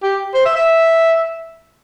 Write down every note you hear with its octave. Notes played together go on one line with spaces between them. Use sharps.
G4
C5
E5
E5